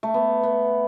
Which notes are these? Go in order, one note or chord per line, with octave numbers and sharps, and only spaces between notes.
A3
B3
B3